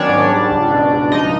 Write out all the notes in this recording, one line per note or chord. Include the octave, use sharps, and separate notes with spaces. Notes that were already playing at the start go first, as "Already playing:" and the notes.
Already playing: D#3 F#3 B3 C#4 D4 C#5 D5
G#2
G3
C#2
B2
C#2
F3 D#4 D#5